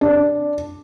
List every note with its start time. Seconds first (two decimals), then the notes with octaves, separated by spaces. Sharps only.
0.01 D4